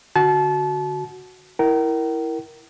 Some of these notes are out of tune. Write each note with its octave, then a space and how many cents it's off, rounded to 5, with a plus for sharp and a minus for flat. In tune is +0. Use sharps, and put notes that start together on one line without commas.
D3 -5 F#4 +0 A5 -30
E4 +0 A#4 +0 G5 -45